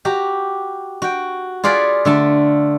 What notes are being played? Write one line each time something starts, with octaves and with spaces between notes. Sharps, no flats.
F#4 G4 A#5
F#4 G5
F4 G#4 D5 F5 F#5 B5
D3 A3 A5